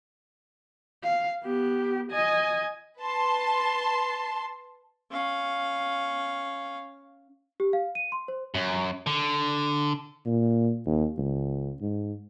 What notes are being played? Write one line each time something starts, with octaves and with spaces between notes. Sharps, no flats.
F5
B3 G4
D#5 G#5
B4 A5 C6
C#4 F5
G4
F5
D#7
C6
C5
F#2
D3
A#2
D#2
C#2
G#2